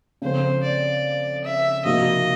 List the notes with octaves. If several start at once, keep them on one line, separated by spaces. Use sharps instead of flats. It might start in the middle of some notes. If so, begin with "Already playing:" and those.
C#3 F3 A3 C4 C5
D5
E5
C3 F3 A#3 D#4 F#4 D#5